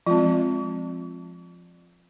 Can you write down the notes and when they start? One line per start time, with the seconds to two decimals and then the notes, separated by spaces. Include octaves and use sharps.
0.07 F3 G#3 C4 F4